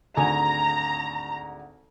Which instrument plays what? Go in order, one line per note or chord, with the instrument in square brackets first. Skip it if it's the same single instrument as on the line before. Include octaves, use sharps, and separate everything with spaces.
[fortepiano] G#1 D2 G#5 [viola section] A#5